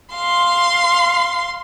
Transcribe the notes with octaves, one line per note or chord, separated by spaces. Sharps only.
F5 C6